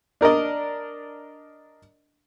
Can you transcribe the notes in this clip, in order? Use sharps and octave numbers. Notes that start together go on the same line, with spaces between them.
D4 A#4 D5 D#5